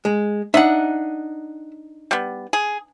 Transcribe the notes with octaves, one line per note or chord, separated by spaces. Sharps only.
G#3
D4 D#4 E5 F#5
G3 B3
G#4